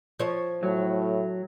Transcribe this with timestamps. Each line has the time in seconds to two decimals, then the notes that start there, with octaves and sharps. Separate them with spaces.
0.19 F3 C#5
0.63 A2 F#3